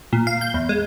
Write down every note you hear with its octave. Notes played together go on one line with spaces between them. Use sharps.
A#2
F5
G6
E2
G#3